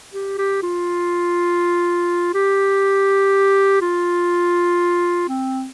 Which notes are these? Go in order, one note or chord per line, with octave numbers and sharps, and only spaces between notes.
G4
G4
F4
G4
F4
C4